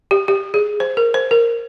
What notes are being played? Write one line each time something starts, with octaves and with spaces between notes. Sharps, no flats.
G4
G4
G#4
C5
A#4
C5
A#4